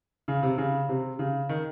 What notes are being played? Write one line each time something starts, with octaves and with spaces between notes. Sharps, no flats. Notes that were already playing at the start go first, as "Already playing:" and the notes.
C#3
C3
C#3
C3
C#3
D#3